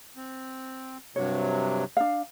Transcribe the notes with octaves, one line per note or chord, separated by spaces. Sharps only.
C4
G2 C3 F#3 C#5
D4 F5